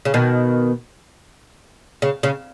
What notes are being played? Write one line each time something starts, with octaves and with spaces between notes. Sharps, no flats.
C#3
B2 D#3
C#3
C#3